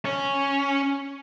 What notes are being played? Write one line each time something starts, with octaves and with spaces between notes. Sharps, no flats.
C#4